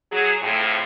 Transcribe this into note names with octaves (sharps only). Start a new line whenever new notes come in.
F#3 G#4
F2 A2